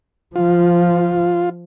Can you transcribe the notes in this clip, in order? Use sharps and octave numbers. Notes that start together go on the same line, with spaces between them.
F3 F4